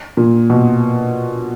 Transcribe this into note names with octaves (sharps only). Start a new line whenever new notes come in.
A#2
B2